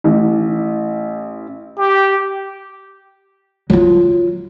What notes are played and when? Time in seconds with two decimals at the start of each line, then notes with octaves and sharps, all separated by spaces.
0.04 A1
1.78 G4
3.70 F#3 F4